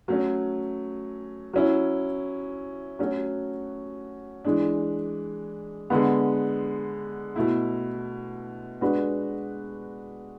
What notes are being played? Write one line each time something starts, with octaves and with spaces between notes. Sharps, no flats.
F#3 A3 C#4
F#3 C#4 E4
F#3 A3 C#4 F#4
E3 G#3 D4
D3 G#3 B3
B2 A3 E4
G#3 D4 F#4 B4